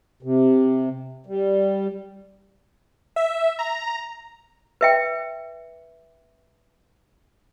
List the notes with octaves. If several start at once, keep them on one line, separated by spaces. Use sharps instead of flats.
C3
G3
E5
A#5
B4 E5 G5